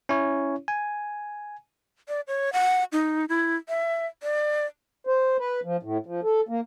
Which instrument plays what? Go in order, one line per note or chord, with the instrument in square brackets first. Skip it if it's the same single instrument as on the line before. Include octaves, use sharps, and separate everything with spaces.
[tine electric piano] C#4 E4 C#5
G#5
[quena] D5
C#5
F#5
D#4
E4
E5
D5
[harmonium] C5
B4
F3
A2
F3
A4
A#3